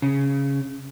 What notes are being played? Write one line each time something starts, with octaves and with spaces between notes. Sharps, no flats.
C#3